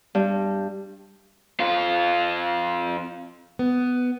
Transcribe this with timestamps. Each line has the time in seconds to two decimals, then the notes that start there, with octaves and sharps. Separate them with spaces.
0.15 G2
1.60 F2 F4
3.59 B3